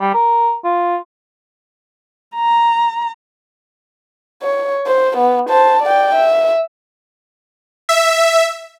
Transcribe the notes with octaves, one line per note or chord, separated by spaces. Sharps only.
G3
A#4
F4
A#5
C#5
C5
B3
C5 A5
D5 G5
E5
E5